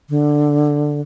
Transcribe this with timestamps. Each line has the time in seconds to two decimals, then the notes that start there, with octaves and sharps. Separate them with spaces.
0.10 D3